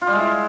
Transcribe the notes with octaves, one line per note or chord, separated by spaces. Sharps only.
F4
G3
G#3
E4